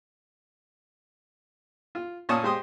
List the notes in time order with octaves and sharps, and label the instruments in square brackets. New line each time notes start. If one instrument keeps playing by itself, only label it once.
[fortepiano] F4
A#2 C#4 A5 C#6 D#6
G#3 G4 C5 C6 D#6